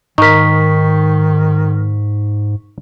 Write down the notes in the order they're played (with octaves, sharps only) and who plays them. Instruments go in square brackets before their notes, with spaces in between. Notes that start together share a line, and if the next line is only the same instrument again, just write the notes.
[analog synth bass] G#2 [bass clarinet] D#3 [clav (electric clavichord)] D#4 A#4 [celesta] C#6 B6